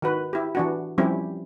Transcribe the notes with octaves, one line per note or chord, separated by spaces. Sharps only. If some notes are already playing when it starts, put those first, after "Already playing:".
D#3 F#4 B4
E4 G4
E3 D4 F#4
F3 G3 C4 C#4 E4 G4